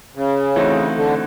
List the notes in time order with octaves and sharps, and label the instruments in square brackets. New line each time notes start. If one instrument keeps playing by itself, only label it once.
[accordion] C#3
[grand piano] E3 A3 C4 D#4 F#4
[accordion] D3